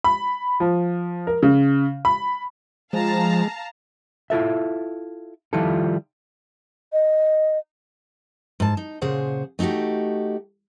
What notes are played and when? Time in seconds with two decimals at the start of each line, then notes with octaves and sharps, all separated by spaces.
0.04 B5
0.60 F3
1.27 A#4
1.43 C#3
2.05 B5
2.93 F3 G#3 F5 A5 A#5
4.30 E4 F4 A4 E5
5.53 D#3 F3 G3 E4 F4 A4
6.93 D#5
8.60 G#2 A5
8.77 D#4
9.01 A#2 C#3 G#4 C5 F#5
9.59 A3 D#4 E4 F#4 G4